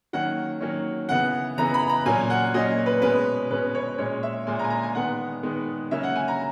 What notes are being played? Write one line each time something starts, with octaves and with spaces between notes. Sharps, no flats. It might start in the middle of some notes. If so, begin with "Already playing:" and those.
D#3 F#3 A#3 C#4 F#5
D#3 F#3 A#3 C#4
C#3 E3 B3 F#5
C#3 E3 B3 A#5
B5
A#5
A#2 F#3 A#3 C#4 G#5
F#5
A#2 F#3 A#3 C#4 D#5
B4
B2 G#3 C#4 B4
B2 G#3 C#4 B4
C#5
A#2 G#3 C#4 C#5
E5
A#2 G#3 C#4 G#5
A#5
G#5
A#5
G#5
D#3 G#3 B3 F#5
D#3 G#3 B3
C#3 F#3 A#3 C#4 E5
F#5
G#5
A#5